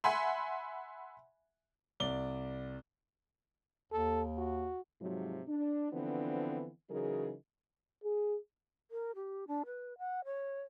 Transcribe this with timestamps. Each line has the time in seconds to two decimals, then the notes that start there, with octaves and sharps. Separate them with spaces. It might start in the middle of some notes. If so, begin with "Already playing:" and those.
0.04 E5 F#5 G#5 B5 C6
2.00 C2 D5 G7
3.92 D#2 A4
4.38 F#4
5.01 G#2 C3 F3 F#3
5.48 D4
5.92 D3 E3 F3 B3 C4 D4
6.90 C#3 E3 F#3 D#4 G#4 A#4
8.04 G#4
8.91 A#4
9.15 G4
9.48 D4
9.66 B4
9.98 F#5
10.25 C#5